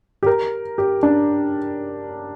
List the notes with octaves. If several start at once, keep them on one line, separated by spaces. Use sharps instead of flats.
G4
A#4
G4
D4